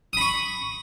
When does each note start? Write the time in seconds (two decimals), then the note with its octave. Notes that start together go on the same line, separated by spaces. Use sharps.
0.13 D#6
0.17 B5
0.21 C#6